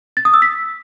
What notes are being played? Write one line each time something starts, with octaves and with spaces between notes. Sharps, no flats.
A6
D#6
E6
B6